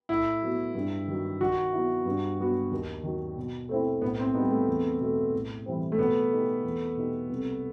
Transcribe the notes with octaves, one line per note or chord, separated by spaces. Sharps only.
A2 E4
F#3 B3 F#4
G2
D#3 F#3
D#3 F#4
F#3 B3 E4
G2
F#3 B3 F#4
D#2
D#3 F#3
B2
A3 C4 E4
A2 B3
C4
G3 B3 D#4
A3
E2
B2 A3
A2
E3 G3 C4
A3
B2 B3
A3 D#4 G4
E2
B2 A3 D#4 G4
C2